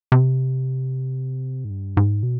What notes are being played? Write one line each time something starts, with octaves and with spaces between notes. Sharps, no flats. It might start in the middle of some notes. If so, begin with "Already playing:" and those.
C3
G#2
G2
G#2
B2